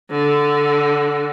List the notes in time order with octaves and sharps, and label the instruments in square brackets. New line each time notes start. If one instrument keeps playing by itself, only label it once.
[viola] D3